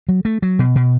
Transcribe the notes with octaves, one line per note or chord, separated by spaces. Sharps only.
F#3
A3
F#3
B2
B2